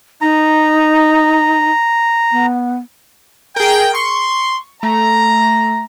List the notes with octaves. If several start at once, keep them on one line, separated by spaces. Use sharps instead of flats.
D#4 A#5
B3
G#4 A#4 G5
C6 C#6
A3 A#5